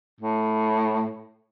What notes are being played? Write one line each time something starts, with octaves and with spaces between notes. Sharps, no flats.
A2